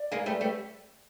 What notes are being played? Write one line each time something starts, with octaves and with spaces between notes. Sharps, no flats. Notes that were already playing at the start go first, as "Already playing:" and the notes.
Already playing: D5
G#3 A#3
G3 A3
G3 A3